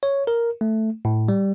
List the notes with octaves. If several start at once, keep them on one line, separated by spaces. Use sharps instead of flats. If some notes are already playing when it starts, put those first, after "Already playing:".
C#5
A#4
A3
A2
G3